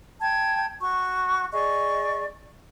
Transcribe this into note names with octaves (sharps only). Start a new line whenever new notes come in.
G5 A5 G#6
F#4 C#6
G#4 D5 D#5 C#6